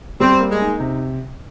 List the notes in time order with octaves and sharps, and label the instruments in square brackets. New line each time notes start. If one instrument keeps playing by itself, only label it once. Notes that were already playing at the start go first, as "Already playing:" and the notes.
[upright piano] G3 [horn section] C4
[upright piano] A#3
[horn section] G#3
[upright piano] D#4
C3